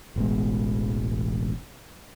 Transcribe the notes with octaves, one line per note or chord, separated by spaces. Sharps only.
E1 A1 E2 G#3